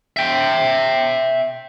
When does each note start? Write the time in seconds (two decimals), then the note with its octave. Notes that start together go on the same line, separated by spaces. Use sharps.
0.17 E5 G5